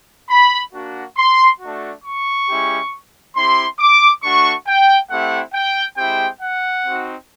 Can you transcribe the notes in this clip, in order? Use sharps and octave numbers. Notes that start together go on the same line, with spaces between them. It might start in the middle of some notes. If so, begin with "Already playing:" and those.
B5
A#3 D4 F#4
C6
A3 D4 F#4
C#6
G#3 C#4 E4 G4
C4 E4 G4 C6
D6
A3 D4 F#4 C#6
G5
A3 C4 E4 G4 F#5
G5
G#3 C4 E4 G4 G5
F#5
C4 D#4 F#4